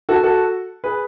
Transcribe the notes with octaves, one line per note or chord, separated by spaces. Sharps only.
F#4 A4
F#4 A4
G#4 B4